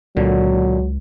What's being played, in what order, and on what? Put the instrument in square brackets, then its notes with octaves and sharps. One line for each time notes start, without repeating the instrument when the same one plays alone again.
[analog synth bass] C#2 [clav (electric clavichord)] A#2 D3 [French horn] F#3